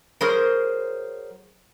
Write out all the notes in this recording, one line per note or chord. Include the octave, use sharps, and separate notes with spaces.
F#3 G#4 A#4 C5